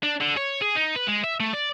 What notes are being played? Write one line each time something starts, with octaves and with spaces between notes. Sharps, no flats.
D4
D3
C#5
G#4
D#4
B4
G#3
E5
A3
D5